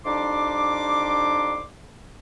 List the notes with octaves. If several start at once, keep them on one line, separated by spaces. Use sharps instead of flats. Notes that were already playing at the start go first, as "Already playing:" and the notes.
F2 G3 D4 D#4 C6 D6